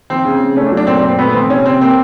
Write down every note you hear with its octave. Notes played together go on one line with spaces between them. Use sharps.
F3 C4
C#3
C#3
A3 C#4
D4
F#3
D4
A#2 C4
C4
A#2
C4
A3 B3
B3
F3 C4
C3 C#4
C3 C4
A#3 C4